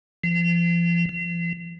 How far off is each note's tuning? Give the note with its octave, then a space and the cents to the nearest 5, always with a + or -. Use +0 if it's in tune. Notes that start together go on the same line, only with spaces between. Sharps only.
F3 -35
F3 -40